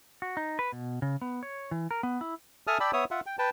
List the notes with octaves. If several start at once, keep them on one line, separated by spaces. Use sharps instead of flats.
F#4
D#4
B4
B2
C#3
B3
C#5
E3
A#4
B3
E4
A4 E5 G#5 A5 D#6 F6
D5 G5 A5 B5 E6
B3 C#5 E5 D#6
F4 E5 F#5
G5
B4 G5 A5